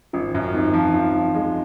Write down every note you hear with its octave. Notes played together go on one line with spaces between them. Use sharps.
G#1 C#4 F4
F#2
G#1 C4 D#4
F3
F3
F3
G#3